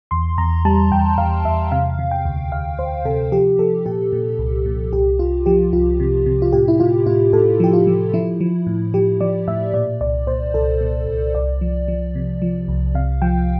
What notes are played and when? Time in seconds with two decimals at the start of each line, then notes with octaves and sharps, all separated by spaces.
0.11 E2 C6
0.38 E2 A#5
0.65 G3 A5
0.92 E2 G5
1.18 E2 F5
1.45 E2 E5
1.72 C3 F5
1.99 C3
2.11 G5
2.25 D2
2.52 D2 F5
2.79 D2 C5
3.05 C3 A4
3.32 F3 G4
3.59 F3 A4
3.86 A#2 G4
4.12 A#2
4.39 C2
4.66 A#2
4.93 C2 G4
5.19 C2 F4
5.46 F3 G4
5.73 C2 F4
6.00 C3
6.26 C3
6.42 F4
6.53 A2 G4
6.68 E4
6.80 A2 F4
7.06 A2 F4
7.33 A2 A4
7.60 F3 G4
7.73 F4
7.87 F3
8.13 F3 E4
8.40 F3
8.67 A2
8.94 F3 G4
9.21 F3 D5
9.47 A2 E5
9.73 A#2 D5
10.01 C2 D5
10.27 A#2 C5
10.54 C2 A4
10.81 A#2
11.08 C2
11.34 C2 D5
11.61 F3
11.88 F3
12.15 C3
12.42 F3
12.68 C2
12.95 C3 F5
13.22 F3 G5